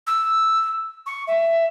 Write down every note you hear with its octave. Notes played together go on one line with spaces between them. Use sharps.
E6
C#6
E5